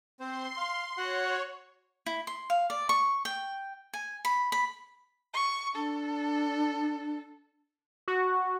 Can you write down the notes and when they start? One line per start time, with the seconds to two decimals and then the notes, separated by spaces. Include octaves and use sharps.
0.20 C4 C5 C6
0.57 F5
0.98 F#4 C#5 F#5
2.06 E4
2.27 C6
2.50 F5
2.70 D5
2.89 C#6
3.25 G5
3.94 G#5
4.25 B5
4.52 B5
5.34 C#6
5.75 D4 A4
8.08 F#4